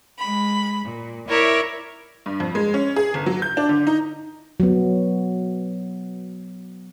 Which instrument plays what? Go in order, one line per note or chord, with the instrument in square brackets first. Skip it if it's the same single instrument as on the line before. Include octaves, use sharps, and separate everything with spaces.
[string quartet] G#3 B5
A#2
E4 A#4 C#5 D5 E5
[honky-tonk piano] G2
F2
G#3
C#4
G#4
G1
F#3
G6
D4
D3
D#4
[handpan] F#3 B3